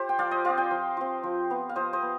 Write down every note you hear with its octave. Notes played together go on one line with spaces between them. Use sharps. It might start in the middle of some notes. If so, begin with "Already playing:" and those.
Already playing: F4 G4 C5
G5
F3 D5 F5
C5 D#5
C4 F4 D5 F5
D#5 G5
F3
C4 F4
F3
B3 F4
F5
F3 C5 D#5
C5 D#5
B3